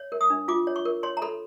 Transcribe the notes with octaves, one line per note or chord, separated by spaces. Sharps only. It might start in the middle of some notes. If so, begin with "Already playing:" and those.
Already playing: C#5
A#4
D#6
D4
F4 D6
C#5
C#6
A#4
C#5 C6
A#5
A4 B5